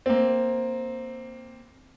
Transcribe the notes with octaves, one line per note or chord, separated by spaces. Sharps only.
A#3 C4